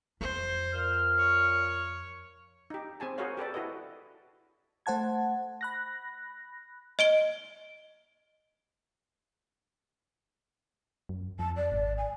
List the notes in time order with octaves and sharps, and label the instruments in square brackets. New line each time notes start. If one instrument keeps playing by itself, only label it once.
[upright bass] F2 [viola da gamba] C5
[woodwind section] A#2 F6
[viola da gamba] C#5
[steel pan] D#4 G4
C4 G#4 G#5 A5
F#4 G#4 A#4 C5 C#5 F5
G4 A4 B4 D5
E4 F#4 A4 B4 D#5
[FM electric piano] A3 C5 F#5 A5 G#6
B5 F#6 A#6
[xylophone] D#5 D7 G7
[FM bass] F#2
[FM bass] F2 [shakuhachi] A5
[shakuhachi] D5
[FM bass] G#1
[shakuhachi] G#5